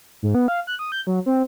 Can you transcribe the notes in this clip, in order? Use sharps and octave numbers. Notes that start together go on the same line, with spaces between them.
G#2
B3
F5
F#6
D#6
G6
F#3
C4